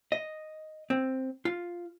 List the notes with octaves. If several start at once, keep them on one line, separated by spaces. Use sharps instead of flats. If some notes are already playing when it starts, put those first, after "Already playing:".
D#5
C4
F4